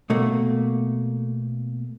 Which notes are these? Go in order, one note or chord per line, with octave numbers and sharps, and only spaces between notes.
B2 A3 A#3